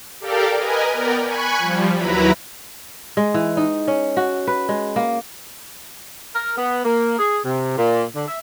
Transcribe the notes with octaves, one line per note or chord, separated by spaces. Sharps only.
G4 A4 A#4 D5 F5 G5
A#4 B4 D#5 G#5
B3 A#4 D5 G5
G#5 B5 C#6 F#6 G#6
F3 G3
D#2 F#3 E4 B4 A#5 B5
G#3
E3
D#4
C#4
F#4
B4
G#3
A#3
A#4
B3
A#3
G#4
C3
A#2
D3
E5